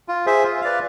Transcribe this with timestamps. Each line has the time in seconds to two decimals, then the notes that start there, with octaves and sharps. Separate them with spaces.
0.08 F4
0.26 G#4 C5 E5
0.43 F4
0.61 B4 D5 F5